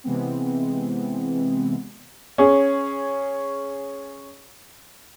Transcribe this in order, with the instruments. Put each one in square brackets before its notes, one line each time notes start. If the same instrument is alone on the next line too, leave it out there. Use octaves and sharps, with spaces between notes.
[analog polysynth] C3 E3 G#3 B3 C4
[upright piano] C#4 G#4